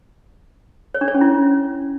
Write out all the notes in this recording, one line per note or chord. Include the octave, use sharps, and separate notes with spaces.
C#5
D4
C#5
C#4
E4